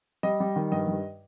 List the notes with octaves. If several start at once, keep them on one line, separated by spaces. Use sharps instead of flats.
G3 D#5
G3
D#3
G2 D#5
G2